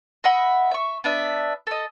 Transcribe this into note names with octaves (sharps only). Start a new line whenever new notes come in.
D#5 E5 F#5 B5
E5 C#6
B3 D4 E5
A4 D#5